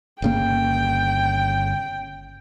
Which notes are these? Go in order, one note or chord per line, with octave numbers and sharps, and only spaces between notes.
G1 C#3 A#3 G5